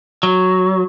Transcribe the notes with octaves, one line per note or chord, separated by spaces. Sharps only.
F#3